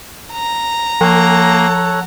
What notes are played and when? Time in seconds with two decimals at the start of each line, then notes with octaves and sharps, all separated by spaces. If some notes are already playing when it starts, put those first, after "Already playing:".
0.32 A#5
1.01 F3 A#3 A4 C#5 F#5